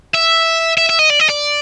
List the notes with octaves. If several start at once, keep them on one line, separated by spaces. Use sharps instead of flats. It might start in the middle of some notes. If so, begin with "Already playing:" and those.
E5
E5
E5
D#5
D5
D#5
D5